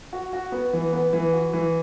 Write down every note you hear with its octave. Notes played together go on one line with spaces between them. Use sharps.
F#4
F#4
B3
E3
B3
E3
F#4
E3